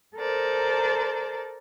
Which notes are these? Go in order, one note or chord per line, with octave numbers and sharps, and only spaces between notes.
A4 A#4 C5 D5